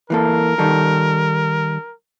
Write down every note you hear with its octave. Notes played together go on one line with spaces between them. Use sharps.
E3 A#3 A4 A#4
D#3 G3 A4